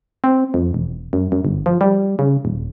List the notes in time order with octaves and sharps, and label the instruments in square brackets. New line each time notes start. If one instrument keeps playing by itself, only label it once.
[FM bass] C4
F2
E1
F#2
F#2
G1
F3
G3
C#3
D#1